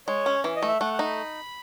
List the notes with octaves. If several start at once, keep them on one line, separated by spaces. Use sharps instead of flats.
G#3 C#5
C#4
E3
D#5
A3
E5
A3 F#5
F#5
D#4
B5